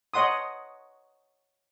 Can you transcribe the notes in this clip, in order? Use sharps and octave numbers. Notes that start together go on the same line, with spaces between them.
C#5 D#5 F#5 C6 D#6